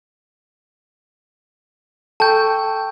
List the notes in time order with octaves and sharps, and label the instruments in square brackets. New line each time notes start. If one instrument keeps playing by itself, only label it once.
[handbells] A4 G5 C#6 [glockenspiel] A5 G6